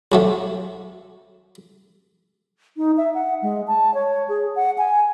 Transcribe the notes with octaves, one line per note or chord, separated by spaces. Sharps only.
C2 F#3 A3
D#4
E5
F#5
G#3
A5
C#5
G#4
F#5
G#5